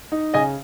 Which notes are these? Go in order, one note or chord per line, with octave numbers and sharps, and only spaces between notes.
D#4
C#3 D#5 G#5